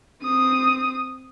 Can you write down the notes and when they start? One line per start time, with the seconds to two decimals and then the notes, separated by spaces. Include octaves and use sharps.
0.23 C4 D#6